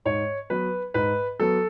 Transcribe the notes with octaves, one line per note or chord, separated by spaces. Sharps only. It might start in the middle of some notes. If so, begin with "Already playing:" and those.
G#2 C#5
F#3 B3 B4
G#2 B4
F#3 B3 A4